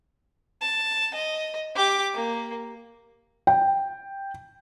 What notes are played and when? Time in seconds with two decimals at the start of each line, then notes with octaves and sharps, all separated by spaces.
0.61 A5
1.14 D#5
1.75 G4 D6
2.14 A#3
3.47 G5